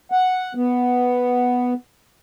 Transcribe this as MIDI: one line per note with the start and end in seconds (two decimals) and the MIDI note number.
0.11 0.53 78
0.55 1.74 59